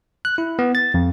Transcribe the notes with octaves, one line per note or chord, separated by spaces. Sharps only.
F#6
E4
B3
A6
F2